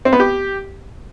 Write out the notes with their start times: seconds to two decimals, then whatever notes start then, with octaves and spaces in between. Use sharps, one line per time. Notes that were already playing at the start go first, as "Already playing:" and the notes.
0.05 C4
0.13 B3
0.20 G4